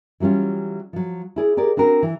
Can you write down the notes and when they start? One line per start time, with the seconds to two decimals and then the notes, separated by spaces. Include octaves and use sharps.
0.20 E3 F#3 G3 C#4 F4
0.93 F3 F#3
1.36 E4 G#4 D5
1.57 G4 G#4 A#4 D5
1.77 C4 D4 F#4 A#4
2.03 E3